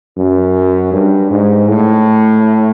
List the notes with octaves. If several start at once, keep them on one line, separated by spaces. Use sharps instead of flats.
F#2
G2
G#2
A2